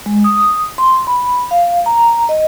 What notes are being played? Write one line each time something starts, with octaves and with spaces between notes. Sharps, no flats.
G#3
D#6
C6
B5
F5
A#5
D#5